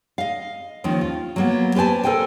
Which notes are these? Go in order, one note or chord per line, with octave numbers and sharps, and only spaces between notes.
D#5 F5
D#2 D#3 F3 C#4
F4
F#3 A#3 B3
G4 B4 C5 G#5 A5
A4 A#4 C5 G5 G#5